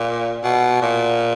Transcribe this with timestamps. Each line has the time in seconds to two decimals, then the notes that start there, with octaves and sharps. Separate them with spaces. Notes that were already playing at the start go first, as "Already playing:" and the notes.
Already playing: A#2
0.44 B2
0.82 A#2